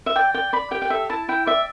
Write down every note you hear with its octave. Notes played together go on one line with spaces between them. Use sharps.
E5
D5 G5
D5 G5
D5 B5
G4 G5
G5
A4 E5
E4 A5
E4 G5
D5 E5